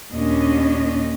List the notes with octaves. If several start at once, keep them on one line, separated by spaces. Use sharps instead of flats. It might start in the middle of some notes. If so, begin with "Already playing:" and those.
D#2 A#2 C#4 D4 D#5